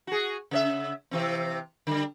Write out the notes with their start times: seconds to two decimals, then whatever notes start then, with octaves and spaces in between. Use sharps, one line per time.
0.07 F#4 G#4
0.51 C#3 C#5 E5
1.11 C3 E3 C4
1.87 D3 G3